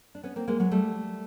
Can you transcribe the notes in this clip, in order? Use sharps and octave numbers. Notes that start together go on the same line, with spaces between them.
D4
B3 C#4
A#3 C4
G#3 A#3
F#3 G#3
G3 A3